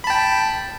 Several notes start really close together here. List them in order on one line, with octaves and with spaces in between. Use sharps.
B5 A5 G5